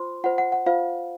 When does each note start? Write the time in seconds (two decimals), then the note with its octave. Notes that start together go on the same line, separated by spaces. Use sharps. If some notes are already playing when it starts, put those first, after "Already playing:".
Already playing: F4 C5 C6
0.24 F4 C5 F#5
0.38 F#5
0.52 F#5
0.66 F4 C5 F5